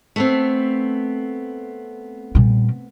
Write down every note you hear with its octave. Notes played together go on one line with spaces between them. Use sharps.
A3 B3 C4
A#2 G3